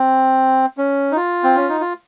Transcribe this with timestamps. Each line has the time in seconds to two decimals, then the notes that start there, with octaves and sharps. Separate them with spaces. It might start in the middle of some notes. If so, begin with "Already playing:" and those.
Already playing: C4
0.78 C#4
1.12 D#4
1.16 F4
1.44 C4
1.56 C#4
1.69 D#4
1.81 F4